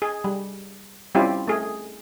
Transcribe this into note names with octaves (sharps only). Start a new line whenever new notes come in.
G#4
G3
G3 C4 C#4 E4 F4 G4
A3 G#4